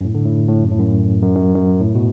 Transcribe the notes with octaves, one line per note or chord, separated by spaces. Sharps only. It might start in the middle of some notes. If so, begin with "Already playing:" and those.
F#2
A2
D3
A2
A2
F#2
A2
F#2
F#2
F#2
F#2
A2
B2